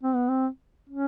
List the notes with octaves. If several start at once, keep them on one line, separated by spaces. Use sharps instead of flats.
C4
B3
C4
C#4